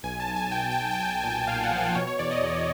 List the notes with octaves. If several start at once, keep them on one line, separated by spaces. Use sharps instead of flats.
B1 G#5
A5
B1
G#5
B1 G5
G#5
B1 G5
G#5
G5
B1 G#5
G5
A#2 G#5
G5
A#2 F5
F#5
F3
F5
B2 C#5
C#5
E2 D5
D#5
E2